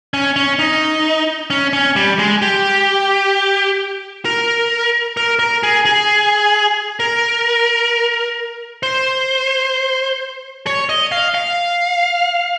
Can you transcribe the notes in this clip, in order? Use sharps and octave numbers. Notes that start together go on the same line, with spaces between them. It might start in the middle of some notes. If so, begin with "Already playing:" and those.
C#4
C#4
D#4
C#4
C#4
G3
G#3
G4
A#4
A#4
A#4
G#4
G#4
A#4
C5
C#5
D#5
F5
F5